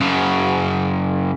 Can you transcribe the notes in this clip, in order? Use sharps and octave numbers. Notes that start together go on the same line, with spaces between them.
F#2 C#3